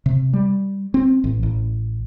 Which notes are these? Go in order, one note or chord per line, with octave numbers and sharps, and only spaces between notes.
C3
G3
C4
A1
A1